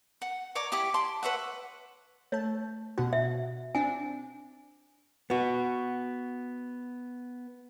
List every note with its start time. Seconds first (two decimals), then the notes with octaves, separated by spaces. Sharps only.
0.22 F#5
0.55 C#5 D5 A#5 D6
0.72 E4 G4 D6 D#6
0.94 D5 A5 C6
1.23 B4 C#5 E5 F#5
2.32 A3 C#5 A5
2.98 B2 F#4 F#5
3.13 E5
3.75 C4 D4 G#5
5.30 B3 F#4